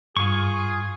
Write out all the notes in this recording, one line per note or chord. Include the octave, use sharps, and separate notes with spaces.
G2 F4 G#4 C#6